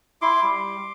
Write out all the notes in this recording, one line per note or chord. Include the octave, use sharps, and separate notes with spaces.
E4 C6 D6
G3